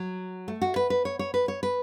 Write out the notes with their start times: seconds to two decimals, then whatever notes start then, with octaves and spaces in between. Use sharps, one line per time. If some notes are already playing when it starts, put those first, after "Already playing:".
Already playing: F#3
0.48 A3
0.62 F#4
0.76 B4
0.90 B4
1.05 C#5
1.19 C#5
1.34 B4
1.48 C#5
1.63 B4